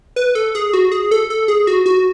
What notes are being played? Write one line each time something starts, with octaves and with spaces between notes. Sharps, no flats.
B4
A4
G#4
F#4
G#4
A4
A4
G#4
F#4
F#4